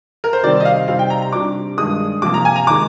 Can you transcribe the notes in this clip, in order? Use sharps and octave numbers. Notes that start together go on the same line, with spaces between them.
A#4
C5
C3 D#3 G3 C4 D5
D#5
F5
C3 G3 C4 D#4 F5
G5
A#5
A#5
C3 G3 D4 D6
G2 D#3 G#3 D#6
C3 F3 A#3 D6
A#5
G#5
A#5
D#3 G#3 D6